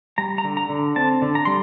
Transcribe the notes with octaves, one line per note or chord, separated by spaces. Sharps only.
G3 A#5
A#5
D3
A#5
D3
C4 A5
D3
A#5
G3 C6